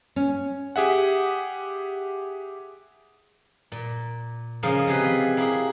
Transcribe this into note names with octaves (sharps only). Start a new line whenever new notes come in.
C#4
G4 G#4 E5 F#5
A#2
C#3 F3 G#3 A#3 D#4
C3 G4 G#4 B4
F3
A#3 E4 G4 G#4